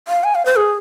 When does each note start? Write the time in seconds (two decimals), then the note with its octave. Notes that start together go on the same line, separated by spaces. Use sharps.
0.08 F5
0.24 G#5
0.35 F5
0.46 C5
0.56 G#4